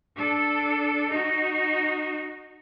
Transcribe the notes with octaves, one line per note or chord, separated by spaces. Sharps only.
D4 A4
D#4 F#4